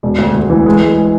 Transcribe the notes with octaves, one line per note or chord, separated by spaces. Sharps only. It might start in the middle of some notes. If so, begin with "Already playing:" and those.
E1
D2
D2
E3
G#3
G#3